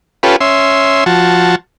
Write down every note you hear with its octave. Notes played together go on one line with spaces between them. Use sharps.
C#4 F4 G4 A4 B4
C#4 E5 C6
F3 F#4 A5